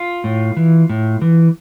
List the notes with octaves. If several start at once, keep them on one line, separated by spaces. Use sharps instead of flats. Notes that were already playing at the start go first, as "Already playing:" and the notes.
Already playing: F4
A2
E3
A2
E3